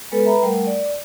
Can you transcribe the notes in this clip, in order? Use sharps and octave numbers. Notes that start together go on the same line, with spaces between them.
G#3 B3 A4 B4
B4 E5 A#5 B5
G3 A3 A#4 F#5
D5